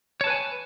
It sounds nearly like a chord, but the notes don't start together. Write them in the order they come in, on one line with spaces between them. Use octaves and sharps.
C#5 A5 B4 G#5